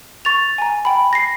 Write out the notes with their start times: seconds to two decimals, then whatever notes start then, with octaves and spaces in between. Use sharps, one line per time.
0.25 C#6 A6 F7
0.58 G#5 A#5
0.85 G5 B5
1.13 A#6 C7